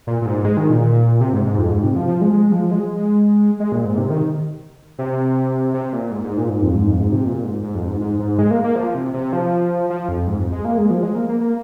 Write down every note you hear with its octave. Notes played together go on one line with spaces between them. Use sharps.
A#2
A#2
G#2
G#3
D#3
A#2
C3
G#2
G#2
F2
G#2
C3
F3
F3
G#3
G#3
F3
G#3
G#3
A#2
G#2
C3
D#3
C3
C3
A#2
G#2
G#2
A#2
G#2
F2
G#2
F2
G#2
C3
A#2
G#2
G#2
F2
G#2
G#2
G#2
G#3
A#3
A#3
F3
C3
C3
F3
F3
F2
G#2
F2
G#3
A#3
G#3
F3
G#3
A#3
A#3
A#3